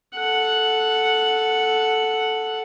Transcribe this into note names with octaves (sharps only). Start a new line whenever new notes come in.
A4 F#5